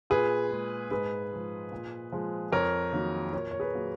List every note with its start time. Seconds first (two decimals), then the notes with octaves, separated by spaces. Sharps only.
0.10 A#2 G#4 B4
0.51 G#3
0.91 G#2 G#4 B4
1.32 F3 G#3
1.72 A#2
2.12 F3 G#3
2.52 F2 A#4 C#5
2.93 D#3 F#3 A#3
3.33 A#2 A#4 C#5
3.51 C#5
3.60 G#4 B4
3.73 F#3 A#3